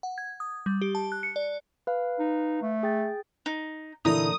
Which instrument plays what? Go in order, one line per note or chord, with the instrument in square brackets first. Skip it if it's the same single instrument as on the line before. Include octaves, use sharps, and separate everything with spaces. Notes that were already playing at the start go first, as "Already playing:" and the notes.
[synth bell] F#5
G#6
D#6
G3
G4
A5
F#6
C#7
D5
[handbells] B4 F5
[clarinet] D#4
A3
[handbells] G#4 G5 A6
[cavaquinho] D#4
[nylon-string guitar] A#2 D3 E3 [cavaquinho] D#4 A#5 [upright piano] E4 [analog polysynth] D#6